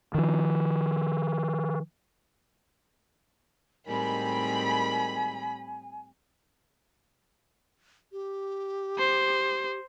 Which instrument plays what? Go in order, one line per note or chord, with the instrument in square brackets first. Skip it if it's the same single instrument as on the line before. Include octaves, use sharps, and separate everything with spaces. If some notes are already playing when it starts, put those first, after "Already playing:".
[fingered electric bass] D#3 F3
[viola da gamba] A2 G3 C4 [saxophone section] D#3 G#3 A#4 [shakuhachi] G#5 [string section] B5
[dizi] G4
[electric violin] C5